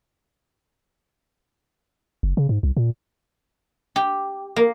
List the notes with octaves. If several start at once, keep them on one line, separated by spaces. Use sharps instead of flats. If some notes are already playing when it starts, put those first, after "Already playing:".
F#1
C#3
G#2
C2
A#2
G4
A#3